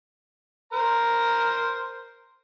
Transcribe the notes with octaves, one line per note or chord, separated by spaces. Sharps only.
A#4 C5 A#5